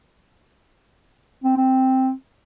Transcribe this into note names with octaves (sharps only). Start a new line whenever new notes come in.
C4
C4